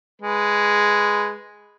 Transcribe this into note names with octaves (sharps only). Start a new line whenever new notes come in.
G#3 B4